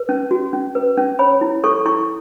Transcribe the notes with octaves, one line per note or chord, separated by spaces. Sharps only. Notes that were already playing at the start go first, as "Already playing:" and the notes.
Already playing: B4
C#4
F#4
C#4
B4
C#4
C#5 B5
E4
A4 C#6
E4 C#6